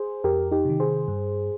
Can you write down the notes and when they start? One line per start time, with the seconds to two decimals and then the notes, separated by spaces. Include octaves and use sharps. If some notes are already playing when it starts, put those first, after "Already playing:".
Already playing: G#4 C5
0.24 F2 G4 A#4
0.52 D#4 G4
0.65 C3 D#3
0.80 G#4 C5
1.08 G2